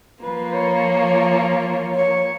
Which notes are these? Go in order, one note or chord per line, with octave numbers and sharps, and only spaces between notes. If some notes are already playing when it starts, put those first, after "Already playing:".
F3 A#3 F4 B4
C#5
C#5